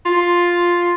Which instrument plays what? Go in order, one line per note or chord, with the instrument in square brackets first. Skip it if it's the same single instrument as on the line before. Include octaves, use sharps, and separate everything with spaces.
[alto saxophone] F4